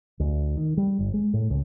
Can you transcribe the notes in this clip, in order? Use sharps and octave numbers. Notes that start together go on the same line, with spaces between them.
D2
D#3
G3
G1
G#3
A2
C#2